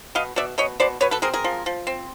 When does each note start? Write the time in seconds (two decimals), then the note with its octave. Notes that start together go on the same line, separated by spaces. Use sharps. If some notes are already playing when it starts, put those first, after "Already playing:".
0.15 B2 D#5 F5
0.36 B2 D5 E5
0.58 B2 C#5 D#5
0.80 B2 C5 D5
1.01 B2 B4 C#5
1.11 A4 B4
1.22 C4 G#4 A#4
1.34 G#4 A#4
1.44 F3
1.66 F3
1.87 C4